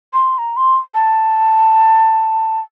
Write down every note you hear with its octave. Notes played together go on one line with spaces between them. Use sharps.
C6
A#5
C6
A5